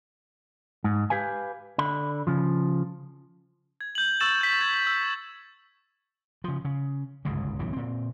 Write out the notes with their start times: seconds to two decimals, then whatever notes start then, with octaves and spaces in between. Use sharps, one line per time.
0.84 G#2
1.10 G4 B4 F5 G#5
1.78 D3 B5
2.27 C#3 F3
3.81 G#6
3.95 G6 F#7
4.20 C#6 E6 A6 E7 F#7
4.41 G6 B6
4.61 G#6
4.87 E6
6.44 C#3 F3
6.65 C#3
7.25 G1 C#2 G#2 C#3
7.59 D1 B1 C#3 E3
7.73 A#2 C4